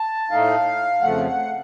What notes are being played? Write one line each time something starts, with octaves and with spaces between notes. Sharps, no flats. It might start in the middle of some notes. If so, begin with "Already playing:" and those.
Already playing: A5
A2 A3 D#4 F5
F2 C#3 F3 A3 F#5
F#5